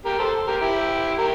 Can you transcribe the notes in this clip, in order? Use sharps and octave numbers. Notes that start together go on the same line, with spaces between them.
G4 A#4
A4 C5
G4 A#4
E4 G4
G4 A#4